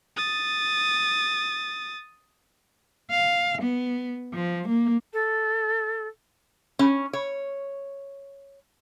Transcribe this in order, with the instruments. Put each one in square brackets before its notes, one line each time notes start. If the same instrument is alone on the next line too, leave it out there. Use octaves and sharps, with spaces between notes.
[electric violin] D#6 A6
[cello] F5
B3
F3
A#3
[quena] A4
[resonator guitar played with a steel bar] C#4
C#5